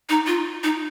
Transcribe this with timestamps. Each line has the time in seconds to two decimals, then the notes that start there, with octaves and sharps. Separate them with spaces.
0.09 D#4
0.27 F4
0.64 D#4